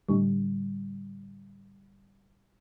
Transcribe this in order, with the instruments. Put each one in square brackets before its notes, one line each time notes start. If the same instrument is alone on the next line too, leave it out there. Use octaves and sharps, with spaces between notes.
[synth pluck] A2 D3 G3